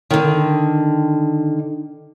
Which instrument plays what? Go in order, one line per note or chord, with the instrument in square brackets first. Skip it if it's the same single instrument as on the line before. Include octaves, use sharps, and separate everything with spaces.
[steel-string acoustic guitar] D3 D#3